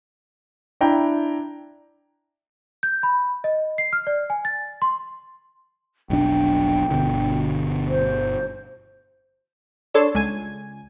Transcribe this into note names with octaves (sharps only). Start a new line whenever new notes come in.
D4 E4 E5 G5 A#5
G6
B5
D#5
C7
F6
D5
G#5
A6
C6
F1 B1 D4 G5
G1 B2 D3
C5
D4 A4 C#5 A5 C6
C#2 G#5 G#6